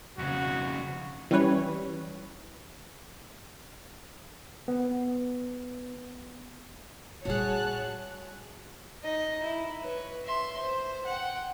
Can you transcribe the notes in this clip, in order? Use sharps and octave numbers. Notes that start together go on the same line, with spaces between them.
F2 C#3 F#4
E3 G3 C#4 B4 C#5
B3
A#1 G3 F#4 G#4 C#5 A5 F#6
D#4 D#5
E4
B4 C#5
E5 C6
C5
F#5 G5